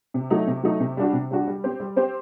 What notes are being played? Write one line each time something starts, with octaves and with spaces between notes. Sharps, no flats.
C3
F#3 A3 D#4
C3
F#3 A3 D#4
C3
G3 D4 F#4
C3
G3 D4 F#4
G3
C4 G4 C5
G3
C4 G4 C5